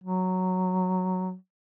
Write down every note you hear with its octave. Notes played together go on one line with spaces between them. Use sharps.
F#3